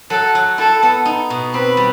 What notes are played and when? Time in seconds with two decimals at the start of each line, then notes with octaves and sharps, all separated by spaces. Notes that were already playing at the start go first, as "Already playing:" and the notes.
0.10 F#3 A4
0.35 F#3
0.58 E4 A4
0.83 B3
1.05 D#4
1.30 B2
1.53 C4 B4
1.77 G3